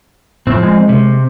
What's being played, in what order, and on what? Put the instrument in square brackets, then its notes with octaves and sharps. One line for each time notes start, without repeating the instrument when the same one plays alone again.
[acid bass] A2 [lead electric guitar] F3 C4
[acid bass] G#3
[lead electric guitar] C3